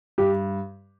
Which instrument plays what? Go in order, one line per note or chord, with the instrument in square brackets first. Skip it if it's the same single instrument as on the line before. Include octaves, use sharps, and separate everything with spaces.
[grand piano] G2 [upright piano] G4